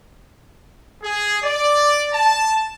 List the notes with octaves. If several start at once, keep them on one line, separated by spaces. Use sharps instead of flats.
G#4
D5
A5